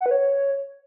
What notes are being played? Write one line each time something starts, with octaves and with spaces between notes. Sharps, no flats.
F#5
B4
C#5